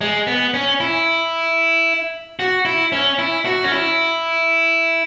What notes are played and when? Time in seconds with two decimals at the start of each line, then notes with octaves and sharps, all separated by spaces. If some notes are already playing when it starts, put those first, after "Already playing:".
0.01 G#3
0.27 B3
0.54 C#4
0.80 E4
2.39 F#4
2.65 E4
2.92 C#4
3.19 E4
3.45 F#4
3.64 C#4
3.72 E4